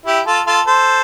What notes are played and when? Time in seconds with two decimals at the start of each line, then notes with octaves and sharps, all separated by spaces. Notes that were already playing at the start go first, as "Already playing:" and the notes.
0.06 E4 G4
0.26 F4 A4
0.47 F4 A4
0.67 A4 C5